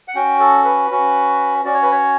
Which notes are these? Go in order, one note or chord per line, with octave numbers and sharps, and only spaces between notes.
F#5
C#4 F#4 G5
A4
B4
C#4 F#4
C#4 F#4 D5
C#5
B4
C#5